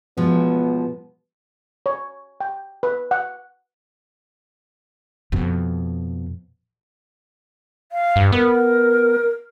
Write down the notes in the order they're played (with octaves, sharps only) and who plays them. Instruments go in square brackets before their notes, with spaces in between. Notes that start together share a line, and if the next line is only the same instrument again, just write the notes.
[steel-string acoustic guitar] B2 F3 G#3 [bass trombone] B3
[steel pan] C#5
G5
B4
F#5
[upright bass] F2 B2
[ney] F5
[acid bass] G2
[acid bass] B3 [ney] A#4